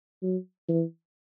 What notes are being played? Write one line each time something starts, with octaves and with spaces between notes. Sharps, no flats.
F#3
E3